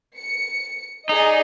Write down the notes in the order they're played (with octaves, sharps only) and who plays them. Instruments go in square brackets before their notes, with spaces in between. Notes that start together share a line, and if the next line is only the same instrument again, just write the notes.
[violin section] C#7
[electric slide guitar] D#4 [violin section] G#4 D5 D#5